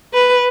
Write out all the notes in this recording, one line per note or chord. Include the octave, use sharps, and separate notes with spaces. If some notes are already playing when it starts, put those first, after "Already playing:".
B4